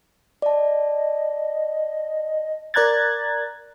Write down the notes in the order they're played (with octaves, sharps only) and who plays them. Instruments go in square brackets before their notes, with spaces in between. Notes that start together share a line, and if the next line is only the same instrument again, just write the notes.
[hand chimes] D5 A5 [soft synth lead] D#5
[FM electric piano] A#4 D5 A#5 F#6 G#6 A6